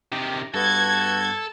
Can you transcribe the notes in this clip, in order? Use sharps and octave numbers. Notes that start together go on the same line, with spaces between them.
C3 D#3 G4
G2 B3 F#4 A4 G#6